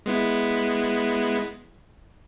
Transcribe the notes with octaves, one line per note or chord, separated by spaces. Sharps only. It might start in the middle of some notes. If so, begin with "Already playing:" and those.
G#3 B3 E4